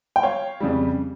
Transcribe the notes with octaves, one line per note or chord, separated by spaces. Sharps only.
G5
C#5 F5
F2 C#3 G3